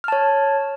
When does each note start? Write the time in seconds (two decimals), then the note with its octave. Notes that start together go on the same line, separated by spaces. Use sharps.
0.04 F6
0.08 A5
0.12 C#5